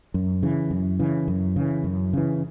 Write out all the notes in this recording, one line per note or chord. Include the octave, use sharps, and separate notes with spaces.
F#2
C#3 E3
F#2
C#3 E3
F#2
C#3 E3
F#2
C#3 E3